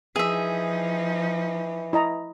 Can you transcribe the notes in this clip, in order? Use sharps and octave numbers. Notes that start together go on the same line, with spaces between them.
E3 F3 D#4 G#4 E5
E4 D#5 A#5